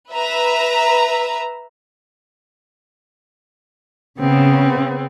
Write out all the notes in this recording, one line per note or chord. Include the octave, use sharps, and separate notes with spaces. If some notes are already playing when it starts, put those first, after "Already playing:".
B4 E5 A#5
C#3 B3 C4